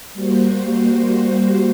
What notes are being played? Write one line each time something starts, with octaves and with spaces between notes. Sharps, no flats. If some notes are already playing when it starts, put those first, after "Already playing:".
G3 A#3 F#4 C5